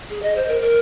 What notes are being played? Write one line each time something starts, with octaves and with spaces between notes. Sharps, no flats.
G#4
D#5
C5
A#4
A#4